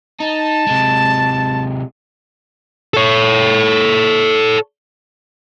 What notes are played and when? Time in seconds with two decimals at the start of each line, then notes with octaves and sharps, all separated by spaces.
0.20 D#4 A5
0.67 C3 G#3
2.94 A4 C#5